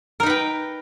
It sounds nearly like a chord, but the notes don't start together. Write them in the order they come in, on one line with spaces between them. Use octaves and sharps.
A#4 D#4 B4 G5